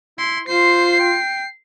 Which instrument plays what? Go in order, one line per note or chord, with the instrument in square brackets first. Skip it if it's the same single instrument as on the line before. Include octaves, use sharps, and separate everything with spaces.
[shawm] E4 [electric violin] C6
[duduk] F4 [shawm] C5 [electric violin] C7
[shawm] G5